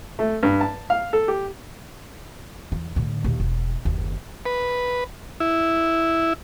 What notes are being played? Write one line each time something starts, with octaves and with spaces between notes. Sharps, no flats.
A3
G2
A5
F5
A4
G4
E2 E3
A2 D3
A#1 D#2
E1
F#1 D#2
B4
E4